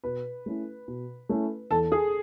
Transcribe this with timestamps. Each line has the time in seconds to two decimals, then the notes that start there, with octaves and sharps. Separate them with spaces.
0.04 B2 B4
0.46 A3 C#4 E4
0.88 B2
1.29 A3 C#4 E4
1.71 E2 A4
1.92 G#4